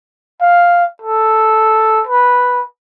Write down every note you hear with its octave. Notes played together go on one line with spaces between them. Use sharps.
F5
A4
B4